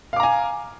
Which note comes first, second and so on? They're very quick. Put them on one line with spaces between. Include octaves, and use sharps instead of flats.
F5 D6 A#5 G#5